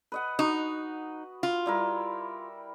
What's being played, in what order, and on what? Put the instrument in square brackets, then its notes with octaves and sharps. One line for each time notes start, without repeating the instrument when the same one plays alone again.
[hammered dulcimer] B4 D#5 F#5
[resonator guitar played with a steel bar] D#4 [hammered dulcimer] F#4
[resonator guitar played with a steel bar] F4
[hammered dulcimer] G3 E4 A#4